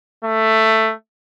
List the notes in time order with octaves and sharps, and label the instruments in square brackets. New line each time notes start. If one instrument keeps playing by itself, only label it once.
[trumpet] A3